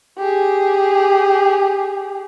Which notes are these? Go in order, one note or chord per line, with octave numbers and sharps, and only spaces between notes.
G4 G#4